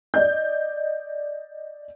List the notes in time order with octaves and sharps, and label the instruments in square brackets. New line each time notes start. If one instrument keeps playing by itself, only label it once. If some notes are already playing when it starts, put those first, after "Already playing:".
[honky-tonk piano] D5 D#5 G6